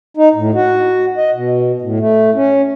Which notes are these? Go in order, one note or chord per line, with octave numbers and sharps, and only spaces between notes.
D#4
A2
F#4
D#5
B2
A2
A3
C#4